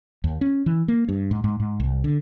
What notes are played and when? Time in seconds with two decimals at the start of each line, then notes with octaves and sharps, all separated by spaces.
0.24 D#2
0.41 C#4
0.66 E3
0.88 A#3
1.09 G2
1.31 G#2
1.44 G#2
1.60 G#2
1.80 C2
2.04 D3